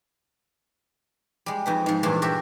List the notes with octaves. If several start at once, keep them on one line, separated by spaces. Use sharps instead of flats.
G3 G#3
F2 D#4 B4
G#2 F3
E2 G2 A#2 A3 D4 C6
F#4 G4 A4 E5